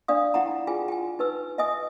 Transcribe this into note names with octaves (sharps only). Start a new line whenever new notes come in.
D4 D5 F5 D#6
E4 F#5 G5 A#5
F4 G#4 G5 G#5
G5 G#5
D#4 B4 E6
D#5 E5 G#5 D#6